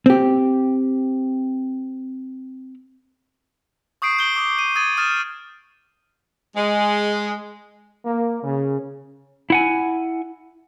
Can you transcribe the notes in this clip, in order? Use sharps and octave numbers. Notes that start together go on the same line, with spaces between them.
C4 G4
C#6 D#6 G6 C7 D7
G6 D7 G7
D6 D#6 C7
D#7
D#6 G#6 A6 D#7
D#6 F6 A6 E7
G#3
A#3
C#3
E4 F#5 G#5